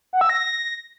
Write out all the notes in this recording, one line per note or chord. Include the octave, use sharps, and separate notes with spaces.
F#5
E6
A#6